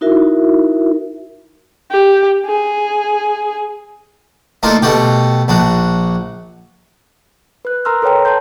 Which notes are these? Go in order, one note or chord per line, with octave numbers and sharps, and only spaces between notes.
D#4 E4 F#4 A#4 E5
G4
G#4
A3 A#3 D4 D#4 F4
B2 A3 F#4 G4
A#1 D4 F#4
B4 F#6
A#4 A#5 C6 E6 F6
A4 B4 C#5 G5 A#5
A5 A#5 C6 G6